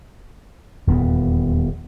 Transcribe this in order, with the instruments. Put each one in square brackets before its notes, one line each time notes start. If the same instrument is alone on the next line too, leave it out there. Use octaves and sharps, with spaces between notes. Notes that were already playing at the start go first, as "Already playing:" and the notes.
[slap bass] D#1 E2 B3